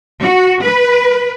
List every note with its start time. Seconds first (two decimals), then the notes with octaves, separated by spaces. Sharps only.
0.22 F#4
0.64 B4